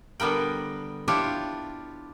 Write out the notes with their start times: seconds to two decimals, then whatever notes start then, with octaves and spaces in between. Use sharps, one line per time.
0.20 D3 G3 B3 A#4 G5
1.08 D4 E4 F4 G4 C#5